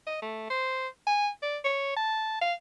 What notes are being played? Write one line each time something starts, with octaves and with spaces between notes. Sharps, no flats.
D#5
A3
C5
G#5
D5
C#5
A5
F5